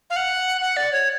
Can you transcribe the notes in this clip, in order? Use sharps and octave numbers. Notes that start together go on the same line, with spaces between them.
F5
F#5
F#5
D5
C#5